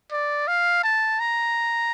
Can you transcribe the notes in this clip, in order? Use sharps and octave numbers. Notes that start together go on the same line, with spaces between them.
D5
F5
A5
A#5